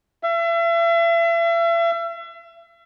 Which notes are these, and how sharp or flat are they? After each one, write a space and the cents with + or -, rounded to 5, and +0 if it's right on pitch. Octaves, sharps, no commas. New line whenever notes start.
E5 +40